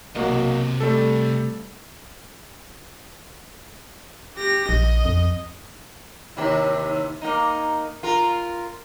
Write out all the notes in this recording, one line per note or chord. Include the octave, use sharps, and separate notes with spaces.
B1 C3 A#3 F#4 D#5
G3 A3 A4
G4 A#6
A#1 D#5
F2
D#2 C3 E4
A#3 D#4
F4 A#4